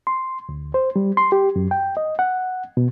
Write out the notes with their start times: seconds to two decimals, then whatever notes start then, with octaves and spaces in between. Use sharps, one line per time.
0.07 C6
0.49 D2
0.74 C5
0.96 G3
1.17 C6
1.32 G4
1.56 F#2
1.71 G5
1.97 D#5
2.19 F#5
2.77 B2